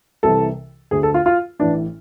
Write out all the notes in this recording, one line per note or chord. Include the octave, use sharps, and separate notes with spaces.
C2 C3 E3 A4
D2 D3 G#4
A4
F4
F4
A1 A2 E3 D4